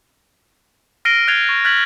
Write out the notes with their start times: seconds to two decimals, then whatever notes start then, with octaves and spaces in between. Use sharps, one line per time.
1.05 F6 A#6 C7 D7 D#7 G7
1.28 F#6 G#6 A6 C7 F7 G7
1.49 C#6
1.65 F6 F#6 G#6 A6 B6 F#7